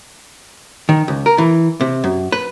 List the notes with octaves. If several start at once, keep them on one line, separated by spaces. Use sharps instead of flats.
D#3
C#2
A#4
E3
C3
F#2
B4